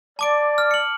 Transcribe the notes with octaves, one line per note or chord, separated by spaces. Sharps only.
D5 A5 D6 D7
F6
C#7 F#7